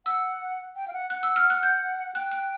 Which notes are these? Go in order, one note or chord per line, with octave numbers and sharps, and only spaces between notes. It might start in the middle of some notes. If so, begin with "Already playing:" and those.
F#5 E6
G5
F5
F#5
F#5 F#6
E6
F6
F#6
G6
G5 F#6
F#6